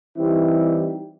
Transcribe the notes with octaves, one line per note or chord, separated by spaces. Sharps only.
E3 G3 C4 D#4 E4 G4